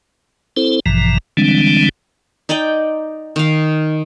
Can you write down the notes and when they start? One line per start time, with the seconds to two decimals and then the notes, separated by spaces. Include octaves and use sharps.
0.57 C4 E4 A4 C5
0.86 A1 G2 B2 E3 F3 A#5
1.37 D3 E3 G3 G#3 C4 D4
2.49 D#4 D5 D#5 G5
3.36 D#3 F5